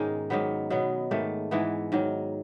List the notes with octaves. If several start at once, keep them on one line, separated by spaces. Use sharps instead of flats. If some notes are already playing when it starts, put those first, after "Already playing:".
Already playing: G#2 B2 D#3 G#3 C#4 D#4
G#2 D#3 F#3 B3
B2 F#3 B3
G#2 D#3 A3
G#2 E3 G#3 B3
G#2 D#3 F#3